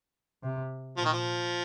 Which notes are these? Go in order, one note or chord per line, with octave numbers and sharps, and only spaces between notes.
C3
A#2 F3
D#3
F3